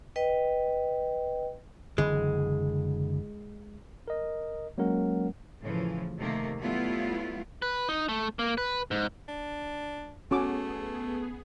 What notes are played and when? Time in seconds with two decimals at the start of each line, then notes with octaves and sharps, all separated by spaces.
0.16 B4 D#5 G5
1.98 F#1 D3 E3 G#3
4.08 A#4 D#5
4.78 F#3 G#3 A#3 C#4 A#4 F#5
5.62 A2 C#3 E3 F3
6.19 C3 D#3 A3 A#3
6.60 F#3 G3 A3 B3 E4 F4
7.62 B4
7.89 D#4
8.09 A3
8.39 A#3
8.58 B4
8.91 G#2
9.28 D4
10.31 A3 B3 C#4 F#4 G#4 D6